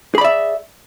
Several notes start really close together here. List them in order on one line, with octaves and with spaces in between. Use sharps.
G#4 B5 D5 E5